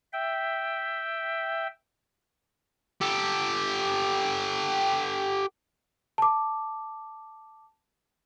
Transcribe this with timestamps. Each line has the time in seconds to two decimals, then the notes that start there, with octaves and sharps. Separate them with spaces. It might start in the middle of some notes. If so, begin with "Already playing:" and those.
0.13 E5 G5
3.01 G4 A4
6.18 A5 D6